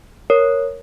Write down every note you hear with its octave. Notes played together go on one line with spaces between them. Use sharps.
A#4 C#5